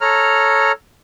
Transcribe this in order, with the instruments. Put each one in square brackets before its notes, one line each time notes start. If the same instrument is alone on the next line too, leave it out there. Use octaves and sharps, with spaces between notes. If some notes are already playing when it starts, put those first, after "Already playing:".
[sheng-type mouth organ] A4 C#5 A#5 F6